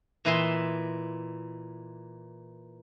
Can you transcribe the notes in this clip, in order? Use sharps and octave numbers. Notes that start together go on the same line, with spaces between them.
A#2 E3 E4 D#5 E5 C6